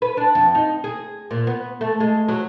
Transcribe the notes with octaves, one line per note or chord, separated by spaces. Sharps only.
B4
D4
F2
D#4
G#4
A#2
B3
A3
G#3
F#3